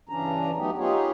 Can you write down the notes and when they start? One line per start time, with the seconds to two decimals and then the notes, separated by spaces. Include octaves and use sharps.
0.09 G2 C#3 E3 C#4 D4 A#5
0.57 F#3 A3 B3 D#4 G4
0.78 B3 D#4 F4 G4 G#4 C#5